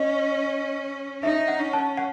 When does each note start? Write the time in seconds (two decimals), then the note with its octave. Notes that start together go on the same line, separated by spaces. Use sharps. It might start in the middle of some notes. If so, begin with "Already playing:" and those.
Already playing: C#4 D#5
1.23 D#4 E5
1.48 F#5
1.60 C#4
1.73 A5
1.97 F#5